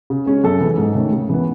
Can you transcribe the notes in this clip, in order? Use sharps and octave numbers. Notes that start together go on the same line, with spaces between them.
C#3
G#3 C#4
F#2 A4
E3 G#3
G#2
D#3 A3 C#4
C#3
E3 B3